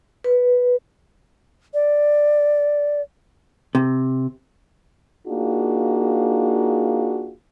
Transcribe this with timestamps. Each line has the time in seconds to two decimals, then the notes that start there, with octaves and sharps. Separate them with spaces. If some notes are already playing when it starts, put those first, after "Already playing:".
0.24 B4
1.74 D5
3.75 C3
5.27 A#3 D4 D#4 F4 F#4 G#4